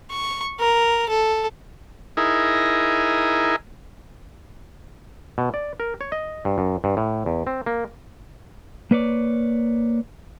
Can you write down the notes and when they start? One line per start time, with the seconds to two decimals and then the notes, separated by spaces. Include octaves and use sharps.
0.11 C#6
0.60 A#4
1.09 A4
2.17 D#4 E4 G#4 A#4
5.38 B2
5.54 D5
5.80 A#4
6.01 C#5
6.12 D#5
6.45 G2
6.58 F#2
6.84 G2
6.97 A2
7.26 E2
7.47 C4
7.66 A#3
8.91 A#3 B4 C#5 D5